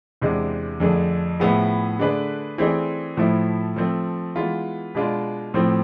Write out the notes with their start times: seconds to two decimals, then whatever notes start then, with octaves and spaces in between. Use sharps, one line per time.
0.21 E2 C3 G#3 D4
0.80 F2 D3 A3 D4 G#4
1.40 A2 F3 B3 E4 G#4
1.99 D3 A3 D4 G#4 B4
2.58 E3 A3 C4 G#4 D5
3.17 A2 F3 A3 E4
3.76 F3 A3 C4
4.36 E3 G#3 B3 F4
4.95 B2 G#3 D4 F4
5.54 A2 F3 A3 C4